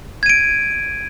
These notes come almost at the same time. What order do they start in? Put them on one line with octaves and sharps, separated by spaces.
G#6 D#7 D7